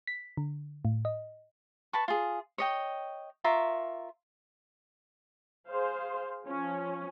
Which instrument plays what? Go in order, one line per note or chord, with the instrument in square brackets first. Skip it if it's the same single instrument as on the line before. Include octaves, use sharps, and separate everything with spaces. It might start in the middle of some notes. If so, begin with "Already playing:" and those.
[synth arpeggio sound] B6
D3
A2
D#5
[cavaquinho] B4 A5 C#6
F4 G#4
C#5 D#5 G5
F4 A#4 E5 C#6
[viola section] G#4 C5 F5
F3 C#4